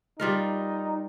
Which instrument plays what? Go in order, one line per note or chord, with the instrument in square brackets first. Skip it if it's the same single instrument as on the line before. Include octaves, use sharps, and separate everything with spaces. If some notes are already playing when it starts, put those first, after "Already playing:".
[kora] G3 F4 A#4 [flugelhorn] D#4